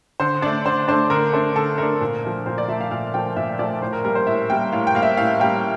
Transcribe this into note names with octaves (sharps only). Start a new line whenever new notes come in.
D3 C5
A3 D4 D5
D3 C5
A3 D4 C5
D3 A#4
A3 D4 C5
D3 A4
A3 D4 A#4
A#2
F3 A3
A#2 C5
D5
F3 A3 E5
F5
A#2 F5
F3 A3 G5
A#2 E5
F3 A3 D5
A2 C5
A#4
G3 A#3 A#4
C5
A2 E5
G3 A#3 G5
A2 F5
G5
G3 A#3 F5
E5
A2 F5
G3 A#3 G5